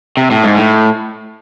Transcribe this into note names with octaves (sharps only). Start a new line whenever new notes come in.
C3
A2
G#2
A2